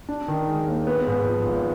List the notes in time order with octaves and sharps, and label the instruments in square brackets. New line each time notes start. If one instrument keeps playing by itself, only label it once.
[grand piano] D4
D#3
G#3
D#2
B3
G#2
F3
G#1